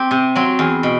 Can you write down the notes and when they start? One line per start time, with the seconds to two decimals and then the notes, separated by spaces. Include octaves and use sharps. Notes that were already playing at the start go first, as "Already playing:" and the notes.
Already playing: C4 G4
0.11 C3
0.35 F#3 C4
0.59 E2
0.83 B2